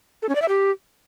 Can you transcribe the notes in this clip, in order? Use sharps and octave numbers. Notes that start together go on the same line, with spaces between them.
A4
C#4
D5
E5
G4